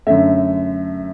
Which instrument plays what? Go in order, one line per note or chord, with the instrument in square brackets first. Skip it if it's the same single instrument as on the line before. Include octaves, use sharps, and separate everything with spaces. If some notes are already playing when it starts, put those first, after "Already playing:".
[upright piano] F#2 D3 A3 E5